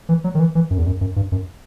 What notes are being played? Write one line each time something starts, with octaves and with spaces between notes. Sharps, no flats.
E3
F#3
D#3
E3
E3
F#2
E2
F#2
F#2
G2
F#2